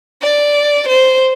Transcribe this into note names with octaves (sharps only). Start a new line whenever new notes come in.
D5
C5